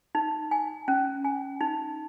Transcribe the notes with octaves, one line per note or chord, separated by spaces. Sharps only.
D#4
G#5
C#4
G#5
D#4